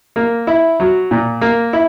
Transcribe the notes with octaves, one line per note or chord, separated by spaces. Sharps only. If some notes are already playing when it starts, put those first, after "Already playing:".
A#3
E4
F#3
A#2
A#3
E4